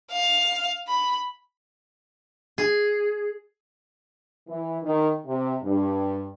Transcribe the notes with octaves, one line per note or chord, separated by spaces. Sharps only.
F5
B5
G#4
E3
D#3
C3
G2